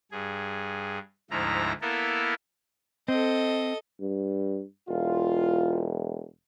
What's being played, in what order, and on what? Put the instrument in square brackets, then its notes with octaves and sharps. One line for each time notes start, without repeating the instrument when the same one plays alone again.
[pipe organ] G2 G#4
D2 G#2 F3 E4 A#5
A#3 B3 E4 A4 A#4
[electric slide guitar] C4 [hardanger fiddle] A4 D#5
[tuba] G2
[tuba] E1 [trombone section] F4